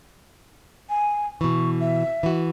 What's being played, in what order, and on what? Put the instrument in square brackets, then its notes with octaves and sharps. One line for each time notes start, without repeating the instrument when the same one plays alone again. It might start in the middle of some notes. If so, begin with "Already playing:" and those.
[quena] G#5
[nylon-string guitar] B2 E3 [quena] C#6
[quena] E5
[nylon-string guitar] E3 F#4